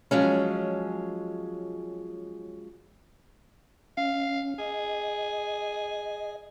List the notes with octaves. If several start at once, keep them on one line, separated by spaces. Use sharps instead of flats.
F3 F#3 G#3 C#4
C#4 F5
G#4 D#5